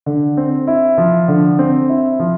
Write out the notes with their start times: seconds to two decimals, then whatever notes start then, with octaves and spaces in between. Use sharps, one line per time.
0.06 D3
0.37 C4
0.67 E4
0.98 F3
1.28 D3
1.59 C4
1.89 E4
2.19 F3